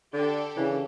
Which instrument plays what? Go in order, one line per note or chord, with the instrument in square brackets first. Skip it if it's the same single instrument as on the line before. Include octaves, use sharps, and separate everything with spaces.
[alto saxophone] D3 [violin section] D4 G4 A4
[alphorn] C#3 [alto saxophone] E3